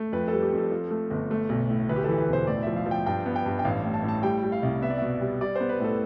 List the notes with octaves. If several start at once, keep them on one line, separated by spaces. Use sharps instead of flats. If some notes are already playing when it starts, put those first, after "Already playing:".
Already playing: A3
F2 B4
A4
G3
G4
F2
A4
F3
A3
G1
A3
B1
A2
D2 B4
G4
E3 A4
B4
E1 C5
A2 D5
F3 E5
F5
F3
G5
G2 G5
B3
G5
G2
G5
A1 F5
A2
A5
A2
A5
G3 G5
G3
F5
C2
B3 E5
D5
B2 E5
G3
G3 D5
B3 C5
B4
A2 A4